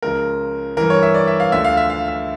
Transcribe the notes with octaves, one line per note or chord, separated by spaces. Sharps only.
C#2 C#3 F3 A#4
G2 E3 A#4
C#5
E5
D5
E5
F5
D2 D3 F3 E5
F5
E5
F5
E5